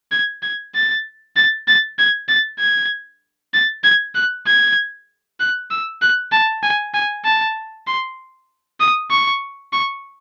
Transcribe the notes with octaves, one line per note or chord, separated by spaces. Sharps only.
G#6
G#6
A6
A6
A6
G#6
A6
G#6
A6
G#6
F#6
G#6
F#6
E6
F#6
A5
G#5
G#5
A5
C6
D#6
C#6
C#6